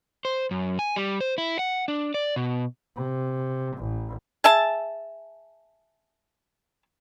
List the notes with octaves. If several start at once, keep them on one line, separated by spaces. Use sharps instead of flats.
C5
F#2
G#5
G3
C5
E4
F#5
D4
D5
B2
C3
A1
G#4 E5 A5